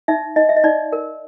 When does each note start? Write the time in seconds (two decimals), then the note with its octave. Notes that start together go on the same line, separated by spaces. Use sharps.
0.08 D#4 E5
0.36 D#4 D#5
0.49 E5
0.57 D#5
0.64 D#4 D5
0.93 A#4